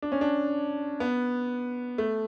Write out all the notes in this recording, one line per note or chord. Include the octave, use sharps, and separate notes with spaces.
D4
C#4
D4
B3
A3